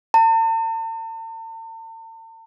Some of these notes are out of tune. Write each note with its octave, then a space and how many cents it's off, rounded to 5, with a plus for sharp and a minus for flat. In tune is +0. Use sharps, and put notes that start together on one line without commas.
A5 +45